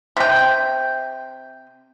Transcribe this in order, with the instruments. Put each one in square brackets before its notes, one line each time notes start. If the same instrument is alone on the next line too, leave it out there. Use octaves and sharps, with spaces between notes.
[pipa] C3 G5